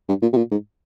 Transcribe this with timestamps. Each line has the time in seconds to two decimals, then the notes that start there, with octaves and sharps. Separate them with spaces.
0.09 G2
0.22 A#2
0.33 C3
0.37 A#2
0.51 G#2